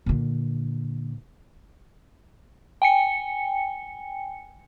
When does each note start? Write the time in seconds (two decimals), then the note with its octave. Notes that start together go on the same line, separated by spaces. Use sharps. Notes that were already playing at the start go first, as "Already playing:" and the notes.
0.06 A#2 D3
2.82 G5 G#5 C#7